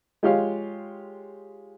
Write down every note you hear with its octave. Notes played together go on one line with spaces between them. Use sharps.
G#3 F4 G4 C#5 F5